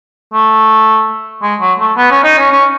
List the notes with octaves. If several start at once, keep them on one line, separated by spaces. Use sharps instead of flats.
A3
G#3
F#3
A3
B3
C#4
D#4
C#4
C#4